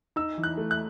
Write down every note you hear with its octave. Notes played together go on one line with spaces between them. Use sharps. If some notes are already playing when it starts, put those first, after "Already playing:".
D#4 E6
E3
F#6
A3
F#6